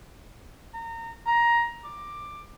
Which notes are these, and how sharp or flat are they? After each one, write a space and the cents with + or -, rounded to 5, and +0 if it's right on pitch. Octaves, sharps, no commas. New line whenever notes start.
A#5 -25
A#5 +15
D6 +10